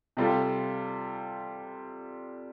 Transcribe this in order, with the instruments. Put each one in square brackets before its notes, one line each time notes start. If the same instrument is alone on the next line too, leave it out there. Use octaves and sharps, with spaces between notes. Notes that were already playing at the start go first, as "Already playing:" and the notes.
[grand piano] C3 G3 F4 A4